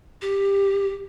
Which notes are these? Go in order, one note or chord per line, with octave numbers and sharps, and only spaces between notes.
G4